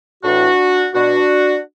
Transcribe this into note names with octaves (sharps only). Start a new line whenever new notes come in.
A2 E3 D4 F#4
B2 D4 F#4